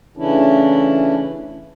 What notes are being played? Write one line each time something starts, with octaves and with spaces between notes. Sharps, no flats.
C#3 E3 A3 C#4 D4 E4